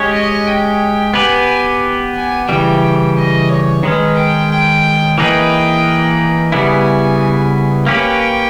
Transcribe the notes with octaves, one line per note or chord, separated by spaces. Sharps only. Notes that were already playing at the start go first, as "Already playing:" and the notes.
Already playing: G#3 C#4 G4 C#5
D#5
G5
B3 G4 B4 G#5
G#5
C#3 E3 G3 G5
D#5
C#5
D#3 G#3 C#4 B4
G5
G5
E3 A#3 D#4 G#4 B4 G5
C#3 G3 B3 E4 G#5
A#3 C#4 G4 B4 G5